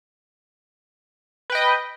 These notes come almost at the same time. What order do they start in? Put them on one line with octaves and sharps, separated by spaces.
B4 G5 D#5